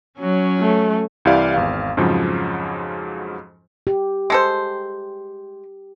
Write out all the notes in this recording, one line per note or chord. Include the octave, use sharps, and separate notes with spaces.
F#3 C#4
A3
C2 E3 E4 G4 D5 F5
G#1 E2 F5
F2 G#2 C#3 F3 F#3
G4
G#3 A4 C5